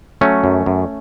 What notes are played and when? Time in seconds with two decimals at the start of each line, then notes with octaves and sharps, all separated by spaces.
0.21 F#3 A3 C#4
0.44 F#2
0.66 F#2